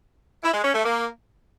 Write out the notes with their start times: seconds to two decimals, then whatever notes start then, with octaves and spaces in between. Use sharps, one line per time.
0.43 E4
0.54 G#3
0.64 C#4
0.74 A3
0.84 A#3